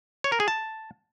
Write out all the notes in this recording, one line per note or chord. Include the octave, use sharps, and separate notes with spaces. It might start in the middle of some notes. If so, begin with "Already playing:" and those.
C#5
A#4
G#4
A5